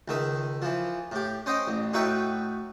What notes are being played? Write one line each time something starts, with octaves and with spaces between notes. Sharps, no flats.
C#2 D#3 E5
E3 F3
A2 G4
C#4 C5 D#5 G5
A1
A2 D#4 F#4 B4 E5 G5